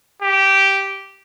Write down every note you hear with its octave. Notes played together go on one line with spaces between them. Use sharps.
G4